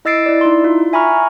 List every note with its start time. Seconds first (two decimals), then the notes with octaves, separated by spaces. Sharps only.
0.05 E4 D#5 E6 A6 C7 D7
0.26 E4 D5
0.41 D#4 E4 C6
0.64 F4
0.93 E5 G#5 A#5 B5 C#6 F6